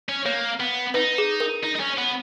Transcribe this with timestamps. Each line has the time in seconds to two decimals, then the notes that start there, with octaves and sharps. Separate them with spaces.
0.09 C#4
0.26 A#3 C#5
0.60 B3
0.94 D#4 B4
1.18 G#4
1.40 A#4
1.64 D#4
1.76 D#4
1.80 C#4
1.98 B3